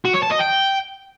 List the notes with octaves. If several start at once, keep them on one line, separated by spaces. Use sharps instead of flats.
F#4
C#5
A5
D#5
G5